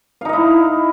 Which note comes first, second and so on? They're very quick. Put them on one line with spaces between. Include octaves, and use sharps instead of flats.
F5 D#4 D#5 E4